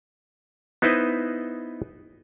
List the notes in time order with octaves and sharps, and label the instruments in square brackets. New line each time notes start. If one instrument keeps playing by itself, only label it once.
[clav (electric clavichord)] B3 D#4 E4 B4 C5 D#5